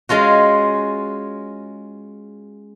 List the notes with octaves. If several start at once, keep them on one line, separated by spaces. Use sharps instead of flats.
G#3 C#4 F4 F#4